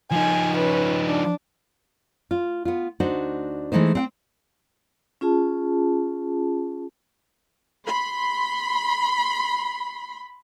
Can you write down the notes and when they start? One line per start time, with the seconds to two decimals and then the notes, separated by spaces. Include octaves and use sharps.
0.11 F3 D#4 G#5
0.56 C#4 B4
1.06 D4
2.31 F4
2.65 B3 F4
3.00 D2 D4 D#4 F#4 C5
3.72 E3 G#3 A3 D#4 C5
3.95 C4 F#5 G5
5.21 C#4 F4 G#4 A5
7.87 B5 C6